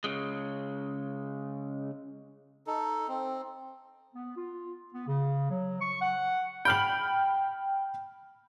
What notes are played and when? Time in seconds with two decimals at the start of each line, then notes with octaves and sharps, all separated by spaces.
0.04 C#3 G#3
2.67 D#4 A4
3.08 C4
4.14 B3
4.37 F4
4.94 B3
5.08 C#3
5.50 F#3
5.81 C#6
6.02 F#5
6.65 G5 B5 F6 F#7